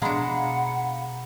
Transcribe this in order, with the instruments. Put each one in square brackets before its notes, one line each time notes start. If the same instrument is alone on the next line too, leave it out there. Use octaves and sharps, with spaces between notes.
[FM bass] B2 [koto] G#3 D4 [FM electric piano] F5 A#5 B5 [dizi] F#5